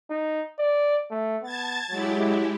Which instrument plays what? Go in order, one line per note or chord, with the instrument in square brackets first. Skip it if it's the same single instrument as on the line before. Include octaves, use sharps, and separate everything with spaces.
[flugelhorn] D#4
D5
A3
[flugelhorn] B3 [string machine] A5 G#6 A6
[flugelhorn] F#3 [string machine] G#3 E4 G4